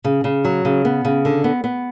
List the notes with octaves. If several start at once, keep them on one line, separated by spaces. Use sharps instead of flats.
C#3
C#3
F#3
C#3
B3
C#3
D3
B3
B3